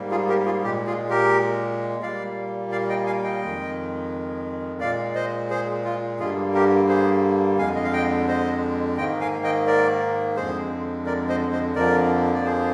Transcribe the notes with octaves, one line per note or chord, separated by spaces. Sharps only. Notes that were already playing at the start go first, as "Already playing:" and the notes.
Already playing: G#2 G3 A#3
F4 G#4
G4 A#4
F4 G#4
A#2 G#3 G4
F4 G#4
G4 A#4
A#2 G3 A#3 D5 F5
D5 F5
D#5 G5
F5 G#5
D#5 G5
F2 D#3 G#3
A#2 G#3 D5 F5
C5 D#5
G#4 C5
F4
G2 D3 G3 A#3 F4 G#4
G4 A#4
G#4 C5
F2 D3 G#3 F5 G#5
D#5
F5
D#5 G5
C5 D#5
G#2 D#3 A#3 D#5 G5
F5 G#5
D#5 G5
A#4 D5
F2 D3 G#3 G#4 C5
A#4 D5
C5 D#5
C5 D#5
F2 D3 F3 A#3 A#4 D5
D5
G#4 C5